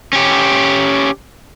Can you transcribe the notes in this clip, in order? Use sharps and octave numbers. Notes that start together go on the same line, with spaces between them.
C#4 G4